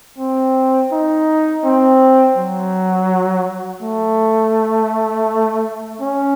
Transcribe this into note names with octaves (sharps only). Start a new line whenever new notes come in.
C4
D#4
C4
F#3
A3
C#4